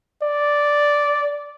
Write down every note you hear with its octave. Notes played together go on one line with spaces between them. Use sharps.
D5